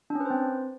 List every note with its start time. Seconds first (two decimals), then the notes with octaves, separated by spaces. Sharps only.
0.10 D4
0.15 C#4
0.20 B4
0.25 C5
0.30 C4